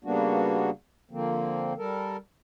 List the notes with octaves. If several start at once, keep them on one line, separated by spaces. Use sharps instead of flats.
C#3 G3 A#3 B3 D4 F#4
D3 F3 A#3 C4
G3 A4 A#4